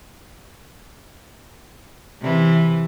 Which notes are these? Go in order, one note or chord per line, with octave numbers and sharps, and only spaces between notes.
C3 E3